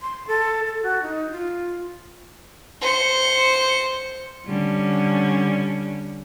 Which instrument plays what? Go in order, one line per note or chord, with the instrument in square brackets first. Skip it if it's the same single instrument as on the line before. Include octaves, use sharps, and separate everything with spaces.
[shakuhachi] C6
A4
A4
F#4
D#4
F4
[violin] C5 C#7
[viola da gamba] D3 G3 C#4